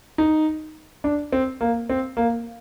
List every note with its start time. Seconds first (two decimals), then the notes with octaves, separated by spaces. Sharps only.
0.18 D#4
1.04 D4
1.32 C4
1.61 A#3
1.90 C4
2.17 A#3